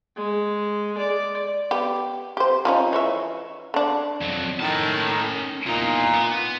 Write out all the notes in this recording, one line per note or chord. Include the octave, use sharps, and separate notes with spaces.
G#3
D5
B3 G4
G4 C5
F3 C#4 D#4
E3 C#5 E5
D3 D4
F2 F#3
A2 D#3 C#4 A5
E2 A#2 D#4
B3